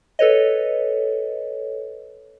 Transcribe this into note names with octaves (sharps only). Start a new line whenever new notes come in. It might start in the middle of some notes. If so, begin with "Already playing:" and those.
A4 B4 C#5 D#5